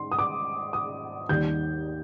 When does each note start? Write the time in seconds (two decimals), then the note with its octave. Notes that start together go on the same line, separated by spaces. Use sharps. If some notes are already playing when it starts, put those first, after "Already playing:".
Already playing: G#2 C6
0.12 D#6
0.19 D6
0.73 D#6
1.29 D#2 D#3 G3 G6